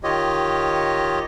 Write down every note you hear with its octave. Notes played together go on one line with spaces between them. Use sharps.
D#3 F4 G4 C#5 D#5